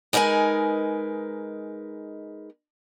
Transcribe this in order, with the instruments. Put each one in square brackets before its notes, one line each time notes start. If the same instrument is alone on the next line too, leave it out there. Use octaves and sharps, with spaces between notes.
[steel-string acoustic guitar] G#3 D#4 A#4 B4 G#5